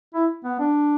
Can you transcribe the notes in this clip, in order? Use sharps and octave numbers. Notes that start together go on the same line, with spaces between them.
E4
B3
D4